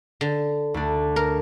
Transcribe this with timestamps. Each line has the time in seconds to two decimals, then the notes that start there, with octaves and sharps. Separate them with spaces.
0.21 D3
0.74 D2 D4
1.16 A#4